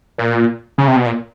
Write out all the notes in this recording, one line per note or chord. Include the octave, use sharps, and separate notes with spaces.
A#2
C#3
C3
B2
A#2